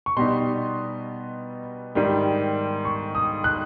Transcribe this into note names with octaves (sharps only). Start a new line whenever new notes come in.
C#6
B2 G3 B3 D#4 C6
G#2 D#3 G3
C#6
D#6
F#6